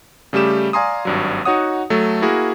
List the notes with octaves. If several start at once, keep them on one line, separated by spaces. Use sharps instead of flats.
C#3 G3 A3 G4 E7
D5 F5 G#5 A#5 C6 D#6
G#1 G2 F#3
D#4 F#4 C#5 F#5 D#6
F#3 A3 A4
A#3 E4 F#4 G#4 A#4